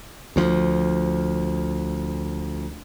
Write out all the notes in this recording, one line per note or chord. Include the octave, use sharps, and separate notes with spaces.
D2 F3